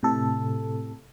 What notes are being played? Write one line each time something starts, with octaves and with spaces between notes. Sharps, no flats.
A2 C3 A4